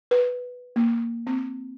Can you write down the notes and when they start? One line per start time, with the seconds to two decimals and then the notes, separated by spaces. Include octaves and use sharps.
0.11 B4
0.76 A#3
1.27 C4